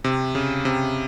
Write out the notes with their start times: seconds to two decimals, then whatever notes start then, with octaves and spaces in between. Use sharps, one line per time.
0.04 C3
0.35 C#3
0.65 C3